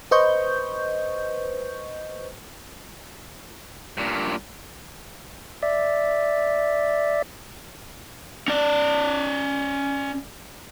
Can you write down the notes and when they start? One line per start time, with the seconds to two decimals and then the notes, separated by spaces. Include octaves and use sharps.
0.11 B4 C5 D#5 C#6 G6
3.97 G2 A#2
5.62 D5 E5
8.48 C#4 D5